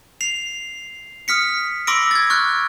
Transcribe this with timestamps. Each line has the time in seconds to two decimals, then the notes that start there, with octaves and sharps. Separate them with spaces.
0.21 C7 F7
1.28 D#6 F6 B6 C#7
1.87 B5 C6 D6 E6 A#6 D7
2.11 G#6 A6
2.30 C#6 F6 F#6